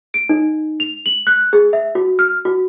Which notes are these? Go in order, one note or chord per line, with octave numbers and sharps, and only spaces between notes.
D7
D#4
F7
F#7
F#6
G#4
E5
F#4
F6
F#4